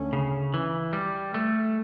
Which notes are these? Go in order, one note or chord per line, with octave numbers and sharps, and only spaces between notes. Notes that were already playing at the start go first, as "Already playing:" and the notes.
Already playing: D2 D3 A3 C#4
C#3
E3
G3
A3